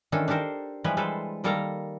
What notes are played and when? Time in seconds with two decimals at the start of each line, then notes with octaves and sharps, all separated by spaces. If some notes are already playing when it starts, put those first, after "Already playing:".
0.12 D#3 E3 C#4 D4 A4
0.28 D4 G4 A4 A#4 C5
0.84 E3 F3 G3 G#3 B4
0.97 G3 G#3 A4 B4 C5
1.44 D#3 G3 A#3 A4 F5 A#5